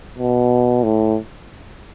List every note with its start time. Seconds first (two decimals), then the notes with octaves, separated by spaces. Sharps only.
0.18 B2
0.83 A2